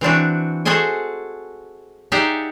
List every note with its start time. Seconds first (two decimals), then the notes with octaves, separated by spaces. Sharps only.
0.01 E3 C4 D4 F#4
0.65 F#4 G#4 A4 C5 D#5 G#5
2.12 D#4 G4 G#4 D5 E5 F#5